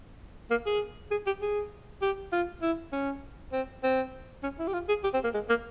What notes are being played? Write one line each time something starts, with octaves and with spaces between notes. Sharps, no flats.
A#3
G#4
G#4
G4
G#4
G4
F4
E4
C#4
C4
C4
C#4
E4
G4
F4
G#4
G4
C4
A#3
G#3
A#3